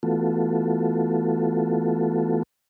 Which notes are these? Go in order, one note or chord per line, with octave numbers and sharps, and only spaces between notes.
E3 A3 B3 F4 F#4 A4